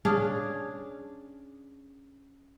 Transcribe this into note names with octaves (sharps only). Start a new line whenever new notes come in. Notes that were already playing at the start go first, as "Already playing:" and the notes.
C#4 D4 G#4 F5